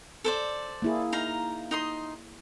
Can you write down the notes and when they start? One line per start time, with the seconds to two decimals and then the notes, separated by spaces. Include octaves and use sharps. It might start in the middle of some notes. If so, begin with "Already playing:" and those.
0.24 A4 C5 D5
0.82 A#3 E4 G#4
1.12 D#4 F5 A#5
1.71 D#4 D#5 C6